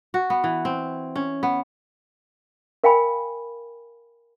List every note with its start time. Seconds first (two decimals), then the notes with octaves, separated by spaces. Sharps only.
0.14 F#4
0.30 B3
0.44 E3
0.65 C4
1.16 C#4
1.43 B3
2.84 A#4 F5 G5 G#5 B5